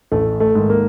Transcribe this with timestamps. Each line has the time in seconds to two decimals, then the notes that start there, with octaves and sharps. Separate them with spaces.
0.12 A1 A3
0.40 A3
0.55 G#2 D#3
0.70 A#3